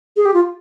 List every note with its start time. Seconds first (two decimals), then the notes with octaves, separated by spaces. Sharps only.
0.16 G#4
0.25 G4
0.34 F4